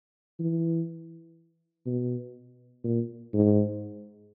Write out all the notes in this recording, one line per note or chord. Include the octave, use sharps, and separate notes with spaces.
E3
B2
A#2
G#2